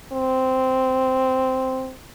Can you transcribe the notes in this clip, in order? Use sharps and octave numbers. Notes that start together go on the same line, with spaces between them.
C4